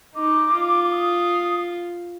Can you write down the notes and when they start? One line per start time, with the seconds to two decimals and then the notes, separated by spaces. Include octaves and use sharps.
0.15 D#4 D6
0.53 F4
0.84 D6
0.92 D#6